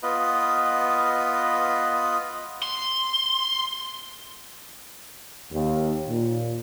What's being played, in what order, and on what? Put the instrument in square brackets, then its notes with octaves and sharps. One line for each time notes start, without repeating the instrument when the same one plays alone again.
[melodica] B3 F4 B4 D#5
[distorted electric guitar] C6
[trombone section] D#2
A#2